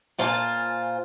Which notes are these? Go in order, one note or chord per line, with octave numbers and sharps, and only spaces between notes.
A#2 F4 C5 F5 G#5 A5